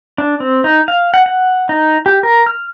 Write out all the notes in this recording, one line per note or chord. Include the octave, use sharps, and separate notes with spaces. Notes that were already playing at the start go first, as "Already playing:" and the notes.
D4
C4
D#4
F5
F#5
F#5
D#4
G4
A#4
F6